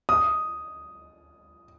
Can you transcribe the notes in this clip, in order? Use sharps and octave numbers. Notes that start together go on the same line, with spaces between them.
D#6